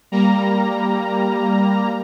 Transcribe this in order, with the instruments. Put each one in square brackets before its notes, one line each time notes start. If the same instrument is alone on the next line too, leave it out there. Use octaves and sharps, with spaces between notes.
[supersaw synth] G3 A#3 A#5